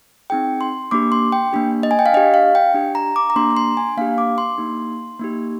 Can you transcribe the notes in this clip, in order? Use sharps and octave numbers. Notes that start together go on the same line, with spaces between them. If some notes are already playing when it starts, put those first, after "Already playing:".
C4 D#4 G#4 G5
C6
A#3 D4 G4 D6
C6
G5
A#3 D4 G4
D#5
G#5
G5
F5
D4 G4 D#5
F5
G5
D4 G4
A#5
D6
A#5
A#3 D4 G4 C6
A#5
C6
G#5
A#3 D4 G4 F5
D6
C6
A#3 D#4 G4
A#3 D#4 G4